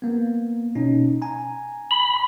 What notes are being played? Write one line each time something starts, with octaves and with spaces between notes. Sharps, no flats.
A#3 B3
B2 C#4 D#4
G#5 A#5
B5